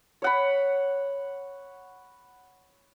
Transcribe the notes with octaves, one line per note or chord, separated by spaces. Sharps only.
C#5 F#5 B5